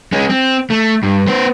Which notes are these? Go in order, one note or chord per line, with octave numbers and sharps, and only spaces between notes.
G#3 C#4
C4
A3
G2
B3 C5